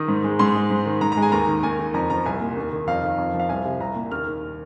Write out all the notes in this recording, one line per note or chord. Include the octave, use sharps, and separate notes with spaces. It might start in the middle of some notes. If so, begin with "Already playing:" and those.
Already playing: D#3 D#6
G#2
G#3
G#2 C6
G#3
G#2
D#3
G#2 A#5
A#5
G#3
G#5
D#2 A#5
D#3
D#2 G#5
D#3
F2 A#5
F3 A#5
C2 G#5
A#2
D#2
D#3
F2 F5
D#3
F2
F3
F5
C2 G#5
C3
C2 A#5
A#2
D#2 F6
D#3